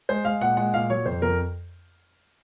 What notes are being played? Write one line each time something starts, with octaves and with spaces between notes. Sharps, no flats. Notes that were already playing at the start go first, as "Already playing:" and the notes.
G#3 C5
G#3 F5
A#2 F#5
G#3 F#5
A#2 F5
F#3 C#5
F2 C5
F2 A#4